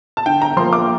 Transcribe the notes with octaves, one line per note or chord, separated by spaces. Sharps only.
A5
D3 G5
A#5
F3 A#3 C6
D6